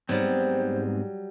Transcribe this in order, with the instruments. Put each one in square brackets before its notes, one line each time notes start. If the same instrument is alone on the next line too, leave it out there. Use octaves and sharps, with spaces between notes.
[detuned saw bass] G#2 [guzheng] F#3 G3 [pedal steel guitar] B3 C4 [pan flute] C5